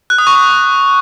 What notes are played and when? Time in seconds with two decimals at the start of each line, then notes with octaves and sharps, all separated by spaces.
0.10 F#6
0.18 D#6
0.27 C#6
0.35 D#6